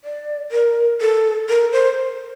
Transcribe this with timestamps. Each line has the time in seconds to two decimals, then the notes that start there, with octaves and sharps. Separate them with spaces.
0.04 D5
0.52 A#4
1.01 A4
1.49 A#4
1.72 C5